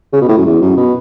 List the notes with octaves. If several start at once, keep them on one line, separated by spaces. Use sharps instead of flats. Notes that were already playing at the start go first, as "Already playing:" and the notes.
C#3
B2
A2
F#2
E2
F#2
B2